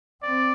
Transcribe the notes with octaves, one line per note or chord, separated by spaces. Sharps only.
C4 D5